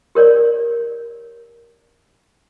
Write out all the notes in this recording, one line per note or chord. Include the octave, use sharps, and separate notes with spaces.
G4 A#4 C#5 D5